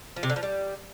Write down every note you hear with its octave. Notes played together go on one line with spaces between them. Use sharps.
F3
C3
D3
F3
G3